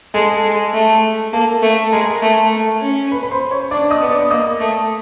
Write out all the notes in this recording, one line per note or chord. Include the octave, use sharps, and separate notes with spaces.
G#3 A4 A5
G#3
A3
A#3 A4 A5
A3
G#3 A#4 A#5
A3
A3
C#4
B4 B5
B5
C5 C6
C#5 C#6
D4 D5 D6
D#5 D#6
B3
D5 D6
A#3 D#5 D#6
A3